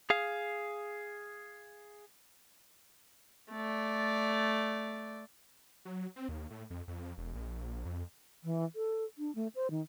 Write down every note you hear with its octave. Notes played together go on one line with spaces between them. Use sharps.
G#4 F5
A3 D5
F#3
C4
D#2
A2
F2
F2
E1
A#1
F2
E3
A4
D4
A3
C5
D#3